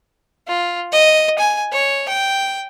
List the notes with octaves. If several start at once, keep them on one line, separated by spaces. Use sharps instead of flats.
F4
D#5
G#5
C#5
G5